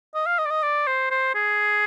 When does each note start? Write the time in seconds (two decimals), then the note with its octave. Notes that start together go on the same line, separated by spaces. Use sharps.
0.15 D#5
0.27 F5
0.39 D#5
0.46 D5
0.51 D#5
0.63 D5
0.87 C5
1.11 C5
1.35 G#4